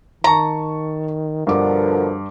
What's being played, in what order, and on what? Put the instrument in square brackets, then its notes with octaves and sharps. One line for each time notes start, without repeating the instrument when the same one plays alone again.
[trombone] D#3 [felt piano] A5 C#6 [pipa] A#5
[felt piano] G2 D6 [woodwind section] B2 D3 F3 [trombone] A#4